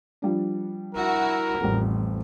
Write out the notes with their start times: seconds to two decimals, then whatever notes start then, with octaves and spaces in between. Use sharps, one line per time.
0.22 F3 G3 D4
0.95 E4 F#4 A#4
1.60 A1 F2 G3